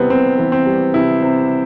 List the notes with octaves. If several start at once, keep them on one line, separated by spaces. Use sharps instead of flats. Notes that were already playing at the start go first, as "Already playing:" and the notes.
Already playing: C3 E3 G3 B3 C4
C3 C4
E3
C4
G3
C3 E4
C3